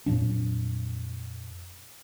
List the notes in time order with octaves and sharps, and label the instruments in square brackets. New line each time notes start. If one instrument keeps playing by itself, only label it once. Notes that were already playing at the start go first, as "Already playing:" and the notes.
[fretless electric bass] F2 A#2 F#3 D4